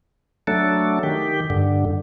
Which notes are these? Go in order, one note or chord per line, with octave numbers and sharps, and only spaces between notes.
F#3 A3 D4 A4
D#3 G4
G2 D3